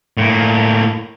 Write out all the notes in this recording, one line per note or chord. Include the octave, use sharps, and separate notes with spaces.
A2 A#3